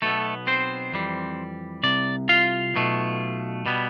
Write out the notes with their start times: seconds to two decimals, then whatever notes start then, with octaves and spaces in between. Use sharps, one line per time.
0.02 B1 B2 A3 B3 A4
0.47 C4 C5
0.92 F2 E3 G3
1.83 C2 C3 D5
2.29 F4 F5
2.74 B1 B2 A3
3.66 B2 G3 B3